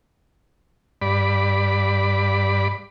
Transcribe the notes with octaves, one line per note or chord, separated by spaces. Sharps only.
G2 D5 B5